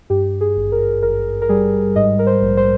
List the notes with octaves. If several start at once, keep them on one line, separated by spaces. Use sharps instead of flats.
G2 G4
G#4
G#1
A#4
G#1 A#4
A#4
G3 G#4
G#2 D#5
A#4
C5
A#1
C5